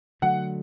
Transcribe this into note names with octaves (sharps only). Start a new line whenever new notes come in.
D3 F#3 A3 F#5